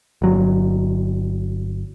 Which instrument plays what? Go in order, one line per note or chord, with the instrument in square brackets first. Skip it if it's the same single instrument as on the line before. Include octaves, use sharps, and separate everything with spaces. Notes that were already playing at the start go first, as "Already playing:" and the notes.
[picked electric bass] G1 F#3